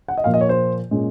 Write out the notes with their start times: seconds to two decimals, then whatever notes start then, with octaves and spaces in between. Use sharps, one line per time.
0.08 F#5
0.18 D#5
0.24 A#2 F3 A#3 F5
0.34 D#5
0.41 C#5
0.49 C5
0.91 A#2 G#3 C#4